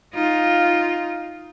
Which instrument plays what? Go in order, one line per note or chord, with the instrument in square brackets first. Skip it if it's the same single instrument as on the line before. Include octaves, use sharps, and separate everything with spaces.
[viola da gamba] D#4 F4